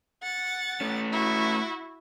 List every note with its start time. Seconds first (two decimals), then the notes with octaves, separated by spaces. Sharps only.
0.23 F#5 A6
0.81 A3 C#4
1.12 E4 F#4